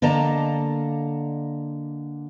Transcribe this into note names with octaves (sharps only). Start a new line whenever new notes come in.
D3 A#3 D5 D#5 A5 A#5